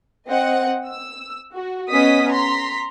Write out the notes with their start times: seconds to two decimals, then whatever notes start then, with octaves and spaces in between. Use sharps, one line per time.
0.26 C4 D#5 F#5
0.86 E6
1.53 F#4
1.90 B3 C#4 D#5 D#6 B6
2.31 A#5 C6 B6